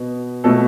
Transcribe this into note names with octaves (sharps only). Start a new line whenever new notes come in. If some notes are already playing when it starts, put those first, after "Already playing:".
Already playing: B2 B3
B2 A3 A4